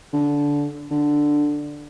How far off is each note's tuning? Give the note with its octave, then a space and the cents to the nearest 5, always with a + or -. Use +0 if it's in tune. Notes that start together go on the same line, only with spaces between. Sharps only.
D3 -20
D3 +5